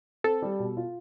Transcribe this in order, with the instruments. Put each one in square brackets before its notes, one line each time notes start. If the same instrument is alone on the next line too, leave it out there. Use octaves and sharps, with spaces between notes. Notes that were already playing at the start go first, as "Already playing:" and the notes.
[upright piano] C4 [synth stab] A4
[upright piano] G3
B2
F4